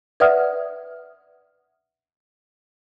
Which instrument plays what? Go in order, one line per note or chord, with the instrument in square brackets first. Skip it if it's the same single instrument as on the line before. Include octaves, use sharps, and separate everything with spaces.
[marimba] B4 D5 E5 F#5 D#6 F6